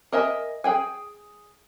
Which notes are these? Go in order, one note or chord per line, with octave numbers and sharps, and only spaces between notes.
A#4 D#5 E5 G#5
G#4 G5 G#5